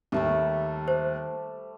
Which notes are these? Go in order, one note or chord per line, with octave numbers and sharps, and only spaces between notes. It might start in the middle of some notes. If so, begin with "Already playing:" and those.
D#2 G3 A3 E5
C5